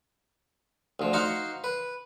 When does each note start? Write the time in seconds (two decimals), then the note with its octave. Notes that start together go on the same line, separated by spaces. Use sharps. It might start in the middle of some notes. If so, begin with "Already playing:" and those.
1.00 D2 F3
1.13 D#4 F#4 C5 F5 C#6
1.64 B4